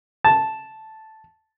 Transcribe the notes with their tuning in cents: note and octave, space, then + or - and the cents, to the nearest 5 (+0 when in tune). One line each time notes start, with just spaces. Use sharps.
A5 -5